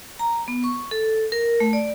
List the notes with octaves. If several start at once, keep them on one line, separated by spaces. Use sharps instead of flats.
A#5
B3
C#6
A4
A#4
A3
D5